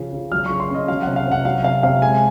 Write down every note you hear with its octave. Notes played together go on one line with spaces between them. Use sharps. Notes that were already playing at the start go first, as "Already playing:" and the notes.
Already playing: C#3 F3
C#3
F#3 F6
C#3 C#6
C6
C#4 D#5
F#3 F5
C3 F#5
F5
C3
F#5
F#3 F5
C3 F5
C3 F5
G#3 G#5